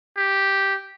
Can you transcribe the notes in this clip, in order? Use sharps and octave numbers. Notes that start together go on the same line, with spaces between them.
G4